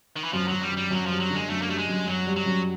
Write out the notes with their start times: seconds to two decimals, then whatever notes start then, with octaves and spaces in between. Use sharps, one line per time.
0.16 D#3
0.24 E3
0.33 F#2 F3
0.48 F#2 F#3
0.61 G3
0.71 F#2
0.77 G3
0.90 F#2 F#3
1.06 F3 G3
1.20 F#3
1.30 D3 G#3
1.49 F#2 A3
1.62 A#3
1.69 G3 A3
1.78 G#3
1.88 F#2
2.07 F#2 F#3
2.26 G3
2.36 F#3
2.46 F#2